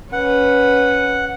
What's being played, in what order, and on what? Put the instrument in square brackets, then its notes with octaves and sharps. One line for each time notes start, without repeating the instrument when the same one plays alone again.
[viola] C#4 B4 [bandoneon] F#5